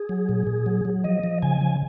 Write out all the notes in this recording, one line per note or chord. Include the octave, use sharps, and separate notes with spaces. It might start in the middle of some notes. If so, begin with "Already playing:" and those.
Already playing: G#4
F#3
A#2
A#2
F#3
F#3
F3 D#5
F3
C#3 G#5
F3